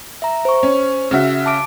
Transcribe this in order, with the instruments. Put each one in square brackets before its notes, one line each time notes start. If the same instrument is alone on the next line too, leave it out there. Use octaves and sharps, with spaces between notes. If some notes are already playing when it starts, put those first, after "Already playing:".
[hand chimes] E5 A#5
C5 C#6
[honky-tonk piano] C#4
C#3 F#4 E5
[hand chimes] A5 D6 D7